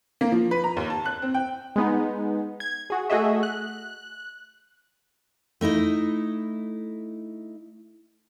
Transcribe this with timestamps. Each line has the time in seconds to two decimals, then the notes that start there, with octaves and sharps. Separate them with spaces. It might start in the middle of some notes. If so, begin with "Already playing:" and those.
0.21 A#3
0.32 F3
0.51 B4
0.64 A#5
0.77 D#2
0.90 A5
1.05 F#6
1.22 C4
1.34 G5
1.76 G#3 B3 D#4
2.60 G#6
2.90 F#4 G#4
3.10 A3 F#4 G#4 D#5 E5
3.43 F#6
5.61 A3 D#4 E4 D#5